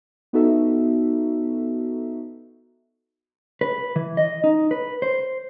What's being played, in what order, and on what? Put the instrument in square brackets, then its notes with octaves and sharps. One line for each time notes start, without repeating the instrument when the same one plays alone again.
[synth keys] B3 D#4 F#4 A4 E5
[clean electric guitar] B4
E3
D#5
D#4
B4
C5